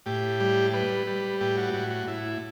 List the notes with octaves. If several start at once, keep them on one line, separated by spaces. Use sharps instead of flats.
A2 G4
G3
G3 B4
G3
A2 G4
F#4
A2 F#4
F#4
A2 E4